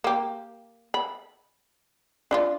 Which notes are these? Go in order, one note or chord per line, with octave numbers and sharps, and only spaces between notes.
A#3 G4
B5
D4 E4 F4